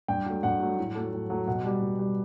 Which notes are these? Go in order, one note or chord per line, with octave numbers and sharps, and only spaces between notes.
G2 G5
F#3 A3
G2 F#5
F#3 A3
A2
F#3 A3
A2
F#3 A3
B2 F#5
G3
B2
G3